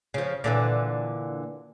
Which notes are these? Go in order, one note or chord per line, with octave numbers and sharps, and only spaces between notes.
C#3 F3
A#2 D3 E3